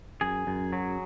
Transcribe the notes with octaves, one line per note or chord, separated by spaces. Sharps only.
F#2 G#4
F#2
F#3